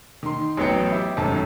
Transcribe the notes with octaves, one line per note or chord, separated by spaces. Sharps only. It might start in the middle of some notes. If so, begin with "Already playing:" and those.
D#3 C6
A1 F#3 B3 G5 C#7
E4 G4
G#1 F#2 A2 A5